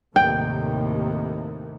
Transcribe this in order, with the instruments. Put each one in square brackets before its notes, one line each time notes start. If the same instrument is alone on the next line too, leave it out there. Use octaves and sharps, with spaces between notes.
[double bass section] D#2 A2 C3 [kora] G5